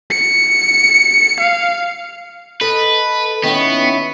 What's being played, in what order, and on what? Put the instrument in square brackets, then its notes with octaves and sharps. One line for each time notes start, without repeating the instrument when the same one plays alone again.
[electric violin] C#7
F5
[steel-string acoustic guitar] A4 D#5 [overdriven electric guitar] B4
[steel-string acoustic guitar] D#3 C#4 E4 [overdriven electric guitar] B3